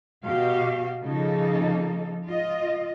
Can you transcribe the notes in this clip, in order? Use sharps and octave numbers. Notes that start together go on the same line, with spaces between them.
B2 F#4 G4 F5
C#3 F3 A#3 D#4 A4
F4 D#5